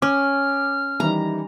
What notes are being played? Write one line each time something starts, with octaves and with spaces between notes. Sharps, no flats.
C#4 D6 F6
D#3 E3 G3 A#5